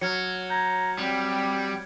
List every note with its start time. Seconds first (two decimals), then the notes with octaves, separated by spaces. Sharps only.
0.01 F#3 F6 G#6 C#7
0.50 A#5 G6 G#6
0.98 G3 C4